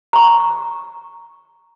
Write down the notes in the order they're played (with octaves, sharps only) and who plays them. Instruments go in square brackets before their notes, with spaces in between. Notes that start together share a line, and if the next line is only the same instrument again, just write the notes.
[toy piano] A#5 C#6